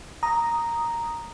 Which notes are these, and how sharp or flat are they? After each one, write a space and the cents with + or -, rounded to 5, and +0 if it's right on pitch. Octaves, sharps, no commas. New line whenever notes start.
A#5 +0 D#6 +0